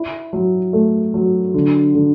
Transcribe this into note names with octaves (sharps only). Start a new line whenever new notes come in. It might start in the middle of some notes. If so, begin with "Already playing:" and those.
Already playing: E4
F#3
A3
F#3
D3
D3